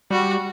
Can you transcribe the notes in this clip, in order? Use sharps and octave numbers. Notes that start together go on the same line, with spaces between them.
G3 F#4